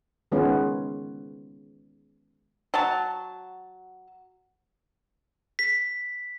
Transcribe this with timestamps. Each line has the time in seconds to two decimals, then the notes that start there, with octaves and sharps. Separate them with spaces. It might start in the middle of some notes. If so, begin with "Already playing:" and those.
0.32 D#3 G#3 B3 C#4 F4
2.74 F#3 A5
5.59 B6